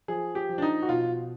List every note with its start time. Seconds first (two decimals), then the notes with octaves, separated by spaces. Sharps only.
0.08 F3 G#4
0.35 G4
0.49 F3
0.58 D4
0.62 D#4
0.83 F#4
0.89 B2 F4